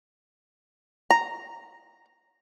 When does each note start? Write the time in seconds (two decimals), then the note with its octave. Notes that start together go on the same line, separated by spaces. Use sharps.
1.10 A#5